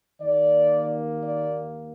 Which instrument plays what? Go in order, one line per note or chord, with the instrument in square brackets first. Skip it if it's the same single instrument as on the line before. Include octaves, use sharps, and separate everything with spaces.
[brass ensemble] D#2 D#3 A#3 D5
D5